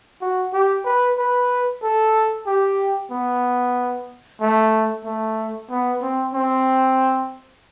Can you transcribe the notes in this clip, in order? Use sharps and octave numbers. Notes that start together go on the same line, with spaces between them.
F#4
G4
B4
B4
A4
G4
B3
A3
A3
B3
C4
C4